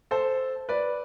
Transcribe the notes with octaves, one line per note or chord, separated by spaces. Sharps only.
A4 C5
B4 D5